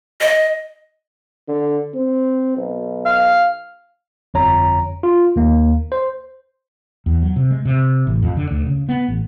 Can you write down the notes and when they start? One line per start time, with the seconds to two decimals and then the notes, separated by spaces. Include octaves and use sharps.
0.21 D#5
1.48 D3
1.94 C4
2.57 B1
3.05 F5
4.34 G1 F2 C#5 A#5
5.03 F4
5.36 D#2 A#3
5.92 C5
7.06 E2
7.22 F#3
7.36 C3
7.51 G#3
7.65 C3
8.07 A1
8.22 F2
8.37 D3
8.51 D2
8.67 C#3
8.89 B3
9.08 A1